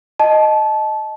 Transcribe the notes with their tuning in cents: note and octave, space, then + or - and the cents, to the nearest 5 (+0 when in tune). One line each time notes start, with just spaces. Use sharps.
D#5 -5 A5 -20